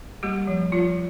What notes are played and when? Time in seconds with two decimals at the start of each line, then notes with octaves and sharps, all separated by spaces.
0.23 G3 A#3 G4
0.47 F3
0.72 F3 F4